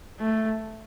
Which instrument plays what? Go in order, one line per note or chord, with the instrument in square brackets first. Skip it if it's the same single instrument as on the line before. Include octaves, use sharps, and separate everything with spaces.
[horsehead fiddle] A3